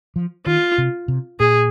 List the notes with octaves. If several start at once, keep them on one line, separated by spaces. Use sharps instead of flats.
F3
D#3 F4
C3
C3
A#2 G#4